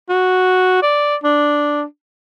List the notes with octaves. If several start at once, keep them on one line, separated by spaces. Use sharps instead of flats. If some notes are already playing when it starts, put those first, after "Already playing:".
F#4
D5
D4